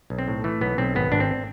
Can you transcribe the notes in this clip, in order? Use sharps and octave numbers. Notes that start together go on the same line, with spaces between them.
B1
C4
A2
E3 A3
B1 B3
B1 C4
G#1 B3
G#1 D4
C4